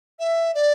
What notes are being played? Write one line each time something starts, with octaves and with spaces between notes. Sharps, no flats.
E5
D5